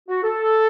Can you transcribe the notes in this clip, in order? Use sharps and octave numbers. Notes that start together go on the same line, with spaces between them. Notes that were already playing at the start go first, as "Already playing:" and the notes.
F#4
A4